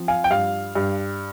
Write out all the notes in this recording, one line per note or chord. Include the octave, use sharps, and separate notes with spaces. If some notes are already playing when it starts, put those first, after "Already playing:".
Already playing: F3 C4
F5 G#5
G5
G2 F5
G2